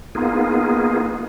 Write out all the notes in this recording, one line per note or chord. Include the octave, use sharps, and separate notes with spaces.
A#3 B3 D#4 F4 G#4